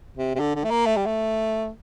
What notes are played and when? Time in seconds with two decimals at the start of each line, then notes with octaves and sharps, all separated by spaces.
0.18 C3
0.35 C3
0.39 D3
0.55 D3
0.64 A3
0.70 A#3
0.86 A3
0.96 G3
1.06 A3